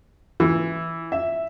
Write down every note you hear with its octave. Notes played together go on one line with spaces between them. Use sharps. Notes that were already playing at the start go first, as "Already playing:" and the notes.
E3
E5